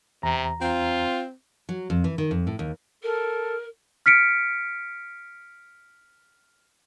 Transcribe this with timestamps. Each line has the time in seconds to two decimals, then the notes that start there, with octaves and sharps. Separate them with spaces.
0.23 E2 C3 A#5
0.61 C4 F4
1.69 F#3
1.90 F2
2.04 E3
2.18 D#3
2.31 F2
2.47 A2
2.59 D#2
3.03 A4 A#4
4.06 F6 B6 C#7 D7